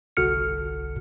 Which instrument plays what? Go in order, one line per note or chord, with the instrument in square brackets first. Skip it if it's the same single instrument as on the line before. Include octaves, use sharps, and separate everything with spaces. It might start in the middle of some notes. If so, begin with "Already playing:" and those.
[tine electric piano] G1 C2 F#4 A4 F6 C#7